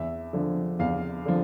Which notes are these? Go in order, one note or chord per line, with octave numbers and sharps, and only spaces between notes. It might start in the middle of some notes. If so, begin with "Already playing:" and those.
Already playing: E2 E5
D3 F3
E2 F5
D3 F3